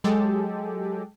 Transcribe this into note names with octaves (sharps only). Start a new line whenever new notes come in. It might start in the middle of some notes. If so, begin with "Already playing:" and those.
F#3 G#3 G4 A4